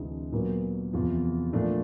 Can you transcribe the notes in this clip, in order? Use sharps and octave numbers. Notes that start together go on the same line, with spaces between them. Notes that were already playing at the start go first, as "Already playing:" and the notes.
Already playing: D2 C3 E3 G#3
A#2 F#3 B3
E2 C3 F3
A#2 F3 A3 D4